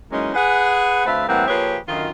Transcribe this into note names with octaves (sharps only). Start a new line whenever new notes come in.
E3 F#3 G#3 A#3 C#4 D#4
G#4 B4 F#5
D2 A3 C4 B4 E5 F5
A2 E3 G3 A#3 C4 F#5
F3 A#3 G4 G#4 B4 C#5
F#2 D3 D#3 D#4 F4